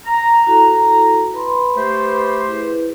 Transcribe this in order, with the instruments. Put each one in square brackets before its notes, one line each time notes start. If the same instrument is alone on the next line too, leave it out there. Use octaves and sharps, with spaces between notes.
[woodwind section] A#5
[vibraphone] E4 F#4 A4
B4 B5 C6
[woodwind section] A3 G4 C5
[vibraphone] E4 G#4 B4